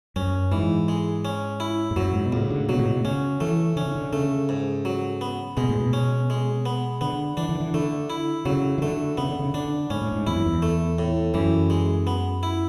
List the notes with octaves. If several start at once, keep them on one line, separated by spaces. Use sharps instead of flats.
F#2 C#4
G#2 E3
G#3
C#4
E4
G#2
F#2 F#3
G#2
B2
C#2 A2
D3
B2 F#3
A2
B2
C#3 C#4
E3 A3
D3 C#4
C#3
D3
C#3 A3
G#2
F#3
B3
B2 G#3
A2
B2
C#4
G#3
B3
D3 B3
E3 D4
D3
E3
D3 A3
E4
C#3 F#3
E3
D3 A3
C#3 B3
D3
C#3
D3 D4
G#2 C#4
A2
G#2
E2 E4
F#2
E2
A3
A2
F#2 E3
G#3
B3
E4